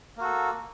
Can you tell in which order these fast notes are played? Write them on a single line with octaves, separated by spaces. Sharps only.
A#3 F#4 A4